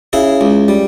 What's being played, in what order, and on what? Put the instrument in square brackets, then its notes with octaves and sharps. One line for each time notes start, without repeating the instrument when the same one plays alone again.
[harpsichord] C#3 E4 G#4
C#2
G3